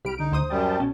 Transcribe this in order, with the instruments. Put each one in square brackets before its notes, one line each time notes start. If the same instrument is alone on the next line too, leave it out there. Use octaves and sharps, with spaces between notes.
[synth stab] C2 D7 [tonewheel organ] G4 B5 F6
[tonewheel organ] D3 [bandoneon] D#4
[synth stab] D2 C5 D#6
[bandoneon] F#2 G3 [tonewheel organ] G5 A5
[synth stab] B1 C#4